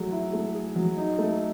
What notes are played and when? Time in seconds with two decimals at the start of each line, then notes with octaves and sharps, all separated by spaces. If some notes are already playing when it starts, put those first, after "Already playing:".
Already playing: F#3 A3 G#4
0.12 E4
0.33 A3
0.55 G#4
0.76 F#3
0.97 D#4
1.18 A3